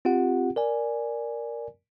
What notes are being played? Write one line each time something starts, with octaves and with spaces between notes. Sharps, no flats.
C4 F4 G4 F#5
A#4 D5 G#5